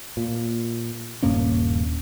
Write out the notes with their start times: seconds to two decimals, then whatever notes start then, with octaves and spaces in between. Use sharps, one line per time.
0.17 A#2
1.23 D#1 G2 A#3 C#4